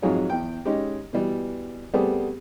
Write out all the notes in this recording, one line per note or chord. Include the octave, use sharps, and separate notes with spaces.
F2 G#2 F#3 F4 G#4 C#5
E2 G5
G#3 C#4 D#4 G4
B2 E3 G3
G3 A3 B3 C4 G4 G#4